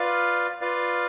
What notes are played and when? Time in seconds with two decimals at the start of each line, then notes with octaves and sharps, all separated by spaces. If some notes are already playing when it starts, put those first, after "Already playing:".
Already playing: F4 B4 D5 F5
0.61 F4 B4 D5 F5